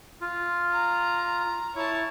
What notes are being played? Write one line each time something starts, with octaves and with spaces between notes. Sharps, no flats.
F4
A#5
E4 C#5 A5